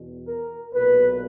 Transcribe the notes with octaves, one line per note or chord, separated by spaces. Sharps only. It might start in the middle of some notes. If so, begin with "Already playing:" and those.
Already playing: E2 B2
A#4
B1 A#2 B4